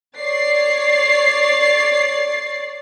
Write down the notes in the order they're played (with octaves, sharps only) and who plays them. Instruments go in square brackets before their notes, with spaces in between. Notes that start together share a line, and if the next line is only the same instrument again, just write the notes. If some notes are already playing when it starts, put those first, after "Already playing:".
[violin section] C#5 D5 A6 C7